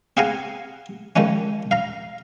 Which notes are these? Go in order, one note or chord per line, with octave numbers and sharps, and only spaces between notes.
C4 G#4 F5 F#5 G#5 A#5
D#3 F3 G#3 C#4
F5 A#5